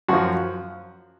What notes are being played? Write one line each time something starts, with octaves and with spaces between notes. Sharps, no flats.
F#2 F3 F#4